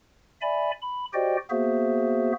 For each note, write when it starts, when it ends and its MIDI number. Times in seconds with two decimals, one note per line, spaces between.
0.41 0.71 74
0.41 0.71 76
0.41 0.71 80
0.41 0.71 83
0.81 1.05 83
1.13 1.37 66
1.13 1.37 67
1.13 1.37 72
1.13 1.37 74
1.13 1.37 75
1.13 1.37 79
1.50 2.32 58
1.50 2.32 59
1.50 2.32 66
1.50 2.32 68
1.50 2.32 72
1.50 2.32 76